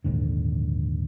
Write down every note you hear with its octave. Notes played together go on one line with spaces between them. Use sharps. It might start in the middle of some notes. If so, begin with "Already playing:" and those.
A#1 D#2 G#2 D3